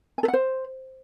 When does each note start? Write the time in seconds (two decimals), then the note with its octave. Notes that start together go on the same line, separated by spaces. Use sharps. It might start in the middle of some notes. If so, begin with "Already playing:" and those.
0.18 G#5
0.23 A4
0.28 F#5
0.33 C5